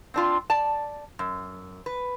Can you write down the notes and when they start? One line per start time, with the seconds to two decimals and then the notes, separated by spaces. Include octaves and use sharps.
0.14 C4 D4 F4
0.50 D5 A5
1.19 F#2
1.86 B4